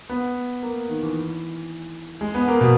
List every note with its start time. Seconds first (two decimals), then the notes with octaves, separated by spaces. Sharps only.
0.09 B3
0.62 A#3
0.89 D#3
1.03 E3
2.21 G#3
2.35 B3
2.48 A#3
2.61 B2